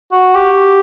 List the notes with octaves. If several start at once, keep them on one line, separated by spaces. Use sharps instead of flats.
F#4
G4